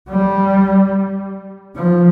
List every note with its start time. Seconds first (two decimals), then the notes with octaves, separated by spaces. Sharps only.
0.10 G3
1.76 F3